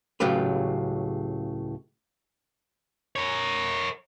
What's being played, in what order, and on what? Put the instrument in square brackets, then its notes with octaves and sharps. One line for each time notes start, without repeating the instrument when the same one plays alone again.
[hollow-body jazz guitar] C#2 A2 C#3 F#3 G4 B4
[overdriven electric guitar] A#4 C#5